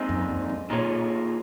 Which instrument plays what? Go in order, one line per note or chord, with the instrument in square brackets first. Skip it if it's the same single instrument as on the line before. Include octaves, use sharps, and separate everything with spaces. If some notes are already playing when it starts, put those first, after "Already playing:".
Already playing: [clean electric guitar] A#2 G#3 C4 D#4
[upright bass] F#2
F2
F#2
[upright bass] A#2 [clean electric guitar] D#3 A#3 F4 G#4 C#5